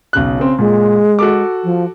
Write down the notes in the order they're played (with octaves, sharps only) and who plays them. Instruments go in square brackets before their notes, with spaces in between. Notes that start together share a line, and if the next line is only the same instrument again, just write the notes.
[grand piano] B1 C#3 F#6
C#3 C4
[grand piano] A#2 [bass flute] G#3
[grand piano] F#4 A4 D6
[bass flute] F3